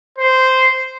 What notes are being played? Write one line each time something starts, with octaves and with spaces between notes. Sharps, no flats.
C5